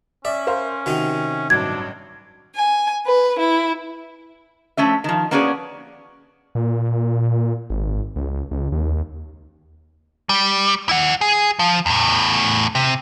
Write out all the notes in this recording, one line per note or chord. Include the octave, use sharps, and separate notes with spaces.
C#4 D5 E5
A#4 C5 F5
C3 D#3 D#4 F#4
A1 G2 F#3 D4 G#6
G#5
B4
E4
F3 A3 C#4 E5
D#3 F3
A#3 B3 C#4 F#4 G#4 D5
A#2
G#1
C#2
C#2
D#2
G3
E4 F#5
G#4
F3
E2 A2
C3